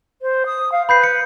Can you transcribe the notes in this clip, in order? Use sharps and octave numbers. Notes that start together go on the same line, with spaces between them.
C5
D#6
F5
B4 B5 G6 C7
C#7